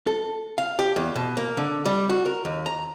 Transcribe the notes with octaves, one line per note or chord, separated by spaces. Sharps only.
A4
F5
G4
E2
B2
A#3
D3
G3
F#4
A#4
D#2
A#5